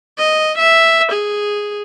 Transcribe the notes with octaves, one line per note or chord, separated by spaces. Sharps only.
D#5
E5
G#4